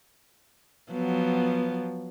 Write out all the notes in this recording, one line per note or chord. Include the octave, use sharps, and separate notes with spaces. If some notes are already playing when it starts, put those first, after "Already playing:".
F3 F#3 B3